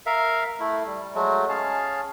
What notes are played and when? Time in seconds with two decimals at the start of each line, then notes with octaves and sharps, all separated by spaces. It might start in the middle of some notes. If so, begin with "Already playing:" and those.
0.06 A#4 E5 F5
0.60 A3 E4
0.87 G3
1.14 F#3 G#3 A3
1.49 C#4 G#4 F5 A5